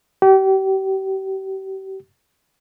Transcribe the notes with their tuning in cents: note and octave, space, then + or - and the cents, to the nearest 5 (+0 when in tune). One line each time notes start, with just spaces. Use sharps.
G4 -35